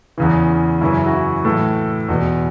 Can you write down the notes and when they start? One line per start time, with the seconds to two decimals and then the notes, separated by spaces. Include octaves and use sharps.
0.18 E2 C#3 E3
0.81 F#2 C#3 E3 E4
1.06 F#4
1.13 E4
1.45 A2 E3 A4
2.09 E2 B2